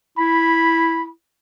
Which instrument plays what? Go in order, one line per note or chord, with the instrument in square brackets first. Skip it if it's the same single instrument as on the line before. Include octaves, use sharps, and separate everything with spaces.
[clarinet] E4 [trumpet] B5